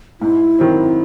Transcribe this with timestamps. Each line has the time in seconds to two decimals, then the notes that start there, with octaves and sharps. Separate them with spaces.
0.20 G#2 E4
0.59 D#3 F#3 C4